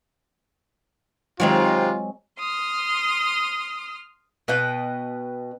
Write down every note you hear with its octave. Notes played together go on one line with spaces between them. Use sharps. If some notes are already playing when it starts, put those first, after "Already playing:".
C3 D#3 F#3 G#3 C4 F4
C6 D#6 F6
B2 B4 D#5 G5